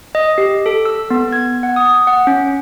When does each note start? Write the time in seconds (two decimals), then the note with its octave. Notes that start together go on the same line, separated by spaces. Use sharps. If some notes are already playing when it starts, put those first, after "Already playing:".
0.15 D#5
0.38 G4
0.66 A4
0.85 E6
1.10 B3
1.33 G#6
1.63 F#5
1.76 D#6
2.07 F#5
2.27 C#4